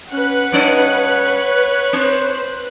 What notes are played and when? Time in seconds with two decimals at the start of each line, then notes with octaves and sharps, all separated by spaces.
0.13 C#4 B4 F#5 F#6
0.52 G2 C#4 C#5 D#5
1.93 C4 C5